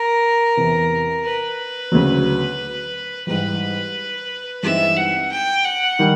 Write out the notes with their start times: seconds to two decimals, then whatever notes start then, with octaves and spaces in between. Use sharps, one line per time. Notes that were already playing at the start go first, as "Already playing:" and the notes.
Already playing: A#4
0.56 E2 C3 E3
1.24 B4
1.92 D2 C#3 F#3
3.27 G#2 E3 G3 B4
4.63 G2 E3 G#3 C4 D#4 E5
4.97 F#5
5.32 G5
5.65 F#5
5.99 D#3 G3